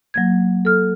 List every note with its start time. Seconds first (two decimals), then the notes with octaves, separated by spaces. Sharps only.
0.14 F#3 A#3 G#6
0.65 A4 F6